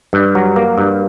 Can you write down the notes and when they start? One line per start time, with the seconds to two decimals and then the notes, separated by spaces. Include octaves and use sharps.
0.13 G2
0.35 F#3
0.56 A#3
0.78 G2